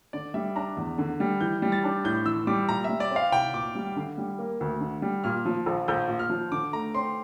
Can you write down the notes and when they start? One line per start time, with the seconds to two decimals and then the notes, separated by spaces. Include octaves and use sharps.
0.13 D3 D5
0.34 G3 E5
0.55 D4 A#5
0.77 E2
0.98 D3
1.20 G3
1.40 E3 G6
1.62 G3
1.72 A6
1.84 D4
2.04 A2 G6
2.25 E3 E6
2.47 G3 D6
2.69 A#2 A#5
2.84 G3 E5
3.00 D5
3.11 C4
3.16 F5
3.32 C2 G5
3.53 A#2 D6
3.75 G3
3.96 D3
4.18 G3
4.39 A#3
4.60 D2
4.81 D3
5.02 G3
5.24 A#2 F6
5.45 F3
5.66 A#1
5.88 A#1 G6
6.08 A#2
6.19 F6
6.30 F3
6.51 D3 D6
6.73 A3 A#5
6.95 C4 C6